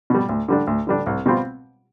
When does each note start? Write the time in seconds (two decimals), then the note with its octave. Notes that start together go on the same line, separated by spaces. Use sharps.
0.10 B2 G3
0.29 D2
0.48 D3 G3 D4
0.67 D2
0.87 D3 G3 D4
1.06 C2
1.26 B2 G3 C4 F4